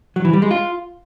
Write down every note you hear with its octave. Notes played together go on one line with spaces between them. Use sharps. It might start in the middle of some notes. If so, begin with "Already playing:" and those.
F#3
E3
G3
G#3
F4